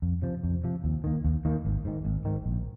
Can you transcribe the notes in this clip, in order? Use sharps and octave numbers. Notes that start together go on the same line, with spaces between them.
F2
C3 F3
F2
C3 F3
D#2
D#3 A#3
D#2
D#3 A#3
G#1
G#2 D#3
G#1
G#2 D#3
A#1